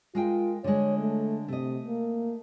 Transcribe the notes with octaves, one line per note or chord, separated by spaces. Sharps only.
G#3 F4 A#4 G5
D3 G#3 C#5
A3
C3 A3 D#5
A#3